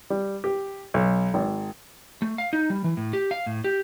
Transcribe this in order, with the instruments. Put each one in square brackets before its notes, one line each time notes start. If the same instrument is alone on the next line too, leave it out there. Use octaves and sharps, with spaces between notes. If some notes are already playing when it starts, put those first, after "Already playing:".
[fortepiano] G3
G4
B1
G#1
[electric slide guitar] A3
F5
D#4
G3
E3
A2
G4
F5
A2
G4